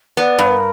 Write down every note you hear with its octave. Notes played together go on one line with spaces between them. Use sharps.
B3 D5
G2
A#4